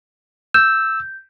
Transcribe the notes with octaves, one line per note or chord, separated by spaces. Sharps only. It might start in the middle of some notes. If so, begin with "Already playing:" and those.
E6 G6